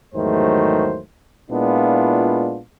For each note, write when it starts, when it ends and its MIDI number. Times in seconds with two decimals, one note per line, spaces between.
0.15 1.01 40
0.15 1.01 44
0.15 1.01 51
0.15 1.01 54
0.15 1.01 57
0.15 1.01 72
1.50 2.59 46
1.50 2.59 56
1.50 2.59 59
1.50 2.59 62
1.50 2.59 64
1.50 2.59 65